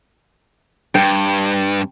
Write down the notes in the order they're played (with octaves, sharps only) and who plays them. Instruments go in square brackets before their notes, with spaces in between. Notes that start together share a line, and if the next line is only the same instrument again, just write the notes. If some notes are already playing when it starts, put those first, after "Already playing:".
[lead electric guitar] G2 [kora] G5